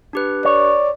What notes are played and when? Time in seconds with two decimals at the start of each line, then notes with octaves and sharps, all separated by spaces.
0.13 D4 G4 B4
0.45 C#5 D5